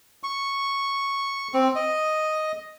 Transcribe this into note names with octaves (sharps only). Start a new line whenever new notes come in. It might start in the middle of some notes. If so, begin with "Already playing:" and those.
C#6
C4
D#5